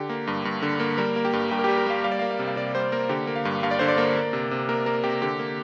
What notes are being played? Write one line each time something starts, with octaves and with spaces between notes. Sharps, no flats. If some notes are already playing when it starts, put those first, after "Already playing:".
Already playing: D3 G4
A#3
G2
G2
D3
A#3
G3 A#4
A#3
G4
G2
G2 G5
A#4
G3 G4
A#4
A#3 F5
G3 F5
D5
A#3 F5
F5
C3
F5
C3 D5
G3 C5
A#3 A#4
D3 G4
A#3
F5
G2
G2 F5
D5
D3 C5
D5
A#3
A#3
C3
C3
A#3 A#4
A#3 A#4
C3 G4
D3 G4
A#3